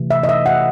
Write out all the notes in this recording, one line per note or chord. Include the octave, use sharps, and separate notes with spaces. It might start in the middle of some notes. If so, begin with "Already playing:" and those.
Already playing: C3 E3 A3
E5
D#5
E5
F#5